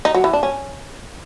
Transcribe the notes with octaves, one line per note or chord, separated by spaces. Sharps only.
D#4
F#3
E3
D4
C#4